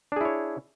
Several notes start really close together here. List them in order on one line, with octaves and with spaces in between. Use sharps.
D4 G#4 E4 C#5